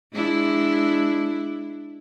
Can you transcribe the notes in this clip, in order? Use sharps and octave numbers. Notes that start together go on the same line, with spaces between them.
G#3 D4 E4